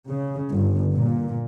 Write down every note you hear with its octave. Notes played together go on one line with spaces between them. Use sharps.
C#3
G1
A#2